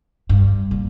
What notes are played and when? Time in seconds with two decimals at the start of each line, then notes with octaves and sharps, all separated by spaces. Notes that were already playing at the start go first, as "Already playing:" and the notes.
0.29 G2
0.71 A#2